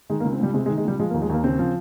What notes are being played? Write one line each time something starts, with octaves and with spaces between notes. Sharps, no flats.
D#3 G#3
A#3
C#2
C4
C#2 G3
C3 G#3
G#3
D#3
G#3
C#2 G3
F3 G#3
A#3
D#2
G#3
D#2 A#3
C#3 C4
F3